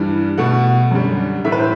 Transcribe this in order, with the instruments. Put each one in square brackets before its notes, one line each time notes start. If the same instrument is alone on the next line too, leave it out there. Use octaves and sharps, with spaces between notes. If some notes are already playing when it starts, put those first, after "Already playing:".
Already playing: [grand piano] G2 E3 G3
B2 A3 F#5
F#2 D3 G3
A2 E3 A3 E5
B4
C5